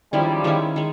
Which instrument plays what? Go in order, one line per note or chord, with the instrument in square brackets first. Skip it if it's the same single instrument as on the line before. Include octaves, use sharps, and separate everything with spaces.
[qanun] D#3 G#3 C#4 E4 [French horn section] F3 G3
[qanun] D#3 G#3 C#4 E4
D#3 G#3